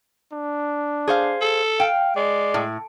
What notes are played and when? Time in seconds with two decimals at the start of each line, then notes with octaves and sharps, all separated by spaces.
0.32 D4
1.08 G#4 C5 F5
1.41 A4
1.80 F5 G5
2.16 G#3 D5
2.54 A2